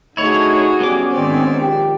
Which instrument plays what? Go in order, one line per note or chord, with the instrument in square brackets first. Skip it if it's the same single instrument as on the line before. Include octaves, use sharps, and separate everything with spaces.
[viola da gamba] D3 F#4 G#4 [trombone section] A3 D#4 [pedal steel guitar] E4 C#5
[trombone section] B1 G3 [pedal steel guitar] B3 C#4 D6
[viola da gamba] G#2 D#3 D5 [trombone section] C4
[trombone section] A#1 A#2 G4